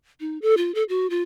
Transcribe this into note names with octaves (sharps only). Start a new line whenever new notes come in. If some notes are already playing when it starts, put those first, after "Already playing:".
D#4
A4
F4
A4
F#4
F4